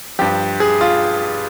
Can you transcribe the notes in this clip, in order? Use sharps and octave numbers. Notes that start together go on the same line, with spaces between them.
G2 F3 G4
G#4
F4